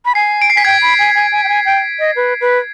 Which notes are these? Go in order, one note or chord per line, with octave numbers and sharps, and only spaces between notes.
B5
G#5 C7
D7
C7
G#5 B6
G5 G#6
B5
G#5
G#5
G#5
G5
G#5
G5
D#5
B4
B4